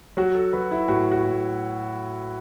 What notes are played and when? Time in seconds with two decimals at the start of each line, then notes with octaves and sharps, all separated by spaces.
0.17 F#3 F#4
0.35 A4
0.53 F#3 B4
0.71 E4
0.88 A2 F#4
1.12 F#4
1.25 A2